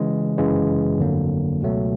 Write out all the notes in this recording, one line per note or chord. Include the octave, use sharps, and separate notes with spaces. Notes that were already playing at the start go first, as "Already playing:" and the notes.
Already playing: C#3 E3 G#3
G1 F#2 C#3 E3 G#3
G1 F2 D3 F#3 A#3
C#2 B2 F#3 A3